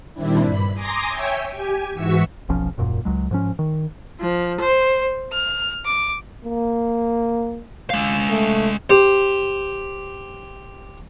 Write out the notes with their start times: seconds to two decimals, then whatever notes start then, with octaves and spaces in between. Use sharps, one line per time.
0.14 A#2 D#3 G3 C4 D4 E4
0.42 G2 B5
0.73 G#5 A#5 C6 D6 D#6 A#6
1.09 C#5 E5 G5 G#5
1.51 G4 G#5
1.94 G#2 E3 F#4 E5 C#6 E6
2.49 F1 B1 F3 C#4
2.78 D#1 F#2 A#2
3.05 C#2 F#3 G#3
3.31 G#2 F3 C#4
3.59 D#3
4.19 F3
4.60 C5
5.32 F6
5.85 D6
6.45 A#3
7.90 G#3 F5
8.30 A3
8.90 G4 C5